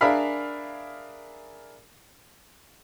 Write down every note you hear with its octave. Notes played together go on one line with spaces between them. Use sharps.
D4 G#4 A#4 E5 F5 B5